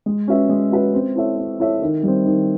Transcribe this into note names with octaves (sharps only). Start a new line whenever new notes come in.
G#3
C#4 F#4 B4 E5
G#3
C#4 F#4 B4 E5
C4
E4 A4 C#5 E5
C4
E4 A4 C#5 E5
D#3
G3 C4
D#3